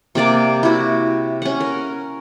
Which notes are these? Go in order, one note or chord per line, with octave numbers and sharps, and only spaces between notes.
C3 A#3 D5 D6
E4 F#4
C#4 F#5
A#4